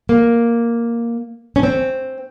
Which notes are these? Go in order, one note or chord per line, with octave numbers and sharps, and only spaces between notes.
A#3
C#4
C4